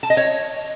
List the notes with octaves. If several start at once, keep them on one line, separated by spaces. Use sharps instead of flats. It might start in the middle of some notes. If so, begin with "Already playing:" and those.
A5
D#5
C#5